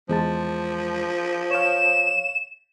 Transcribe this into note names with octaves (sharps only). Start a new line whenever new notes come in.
E2 F3 G#3 A5
C#5 F5 E7